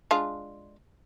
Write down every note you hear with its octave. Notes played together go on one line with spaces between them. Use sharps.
G#3 D4 F4